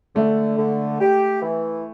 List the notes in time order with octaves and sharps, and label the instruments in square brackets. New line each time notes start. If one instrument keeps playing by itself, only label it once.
[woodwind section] D3 [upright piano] A3
[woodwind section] D3
G4
E3